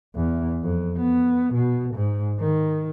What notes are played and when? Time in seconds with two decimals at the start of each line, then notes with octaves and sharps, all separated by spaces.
0.15 E2
0.63 F2
0.97 B3
1.53 B2
1.94 G#2
2.40 D#3